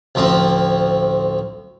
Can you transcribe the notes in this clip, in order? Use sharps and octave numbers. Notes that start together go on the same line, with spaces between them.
A1 D2 F3 C4 A5